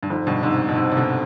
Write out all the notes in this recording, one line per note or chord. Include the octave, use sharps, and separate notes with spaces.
G2
F2 G#2
G2 B2
G#2 C3
B2
G#2 C3
C3
B2 D3